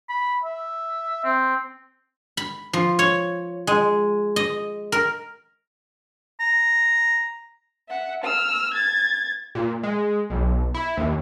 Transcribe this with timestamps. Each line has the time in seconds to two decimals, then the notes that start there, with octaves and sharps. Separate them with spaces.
0.09 B5
0.44 E5
1.24 C4
2.37 B5
2.73 F3
2.99 C#5
3.67 G#3
4.36 D#5
4.92 A#4
6.40 A#5
7.89 E5 F#5
8.24 E6 F6
8.74 G#6 A6
9.55 A#2
9.83 G#3
10.30 B1
10.74 E4
10.97 D#2